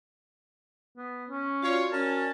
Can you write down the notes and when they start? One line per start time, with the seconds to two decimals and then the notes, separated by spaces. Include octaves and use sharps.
0.97 B3
1.29 C#4
1.63 F4 F#4 C#5 D5
1.92 C#4 A#4 A5